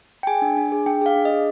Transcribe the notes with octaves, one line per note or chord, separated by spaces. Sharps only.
G5
G#4 G#5
D4
D4
G#4
D4 G5
G#4 F5
D4
D#5
G#4